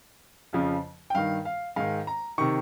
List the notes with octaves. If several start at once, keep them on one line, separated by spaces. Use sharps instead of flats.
F2 C#3 F3
G5
G2 D#3 F5
F5
G#2 D#3 F5
A#5
C3 D#3 C#6